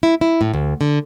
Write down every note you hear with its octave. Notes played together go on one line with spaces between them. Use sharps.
E4
E4
A2
D2
D3